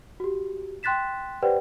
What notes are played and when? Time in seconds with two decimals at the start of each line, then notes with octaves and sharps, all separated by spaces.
0.20 F#4 G4
0.83 G5 C6 F#6 A6 B6 E7
1.43 G4 B4 C5 D5 F#5 G5